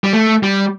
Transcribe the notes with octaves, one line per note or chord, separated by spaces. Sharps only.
G3
A3
G3